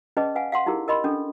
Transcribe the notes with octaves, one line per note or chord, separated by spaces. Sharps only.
C#4 G#4 B4 D5 D#5 A5
B4 F5 F#5 G#5
F5 F#5 C6
D#4 E4 G4 G#4 A#4
A#4 D#5 B5 C6
C#4 D4 A4